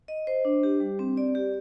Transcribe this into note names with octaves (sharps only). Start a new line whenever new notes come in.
D#5
C5
D4
G4
G3
C4
D5
G4